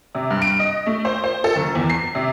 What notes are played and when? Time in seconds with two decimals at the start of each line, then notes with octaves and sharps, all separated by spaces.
0.15 C3
0.30 G2
0.42 D7
0.59 D#5
0.86 A3
1.05 C5
1.24 C5
1.44 A4
1.56 F#1
1.75 E2
1.90 C7
2.15 C3